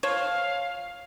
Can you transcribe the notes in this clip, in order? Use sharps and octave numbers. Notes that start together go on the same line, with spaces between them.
F3 C5 C#5 F5